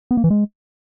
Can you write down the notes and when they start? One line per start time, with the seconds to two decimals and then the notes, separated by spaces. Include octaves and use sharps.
0.11 B3
0.17 A#3
0.24 E3
0.30 G#3